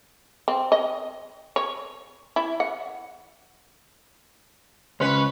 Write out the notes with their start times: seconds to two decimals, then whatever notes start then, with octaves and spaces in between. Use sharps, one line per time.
0.48 C4
0.72 D#5
1.56 C#5
2.36 E4
2.60 F#5
5.00 C#2 C#4 B4 C6